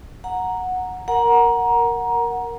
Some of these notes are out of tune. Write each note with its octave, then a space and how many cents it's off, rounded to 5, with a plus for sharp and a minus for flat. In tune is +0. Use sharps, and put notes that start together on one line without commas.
F#5 -5 A#5 +0
A#4 +0 F#5 +0 A#5 +20